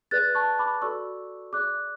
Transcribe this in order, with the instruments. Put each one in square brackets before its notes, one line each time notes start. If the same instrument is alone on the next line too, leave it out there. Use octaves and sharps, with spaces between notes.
[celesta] G#4 B4 D5 F#6 A6
A5 C#6
B5 D6
F#4 A4 D5 C#6 E6
G#4 D5 D6 F#6